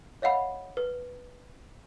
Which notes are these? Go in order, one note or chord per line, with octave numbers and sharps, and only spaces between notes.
C#5 D#5 F5 F#5 B5
B4